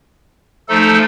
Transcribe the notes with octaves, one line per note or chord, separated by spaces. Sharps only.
F3 A3 D#4 A4